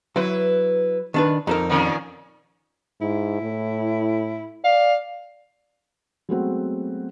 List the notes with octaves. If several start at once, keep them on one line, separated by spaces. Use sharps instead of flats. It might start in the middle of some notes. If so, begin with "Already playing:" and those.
F#3 E4 B4
D#3 D4 B4
F2 D#4 A4 A#4
A#2 D#3 C#4
G#2 E4
A2
D5 F5
F#3 G#3 A3 B3 C4 F#4